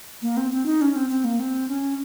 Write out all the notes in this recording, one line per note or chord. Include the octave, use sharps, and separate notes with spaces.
A#3
C4
C4
D#4
C#4
C4
C4
A#3
C4
C#4